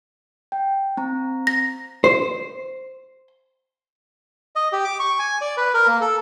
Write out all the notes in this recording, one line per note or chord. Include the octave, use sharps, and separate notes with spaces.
G5
C4 A#5
A#6
C5
D#5
G4
D6
C#6
G#5
D5
B4
A#4
A#3
A4